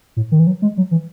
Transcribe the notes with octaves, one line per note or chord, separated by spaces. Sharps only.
A2
D#3
E3
F#3
G#3
F#3
E3